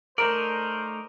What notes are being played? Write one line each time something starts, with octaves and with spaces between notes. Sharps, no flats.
A3 D#4 A#4 C5 D5